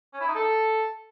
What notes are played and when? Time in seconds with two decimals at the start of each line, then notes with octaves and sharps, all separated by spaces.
0.13 C#4
0.21 E4
0.28 D#4
0.35 A4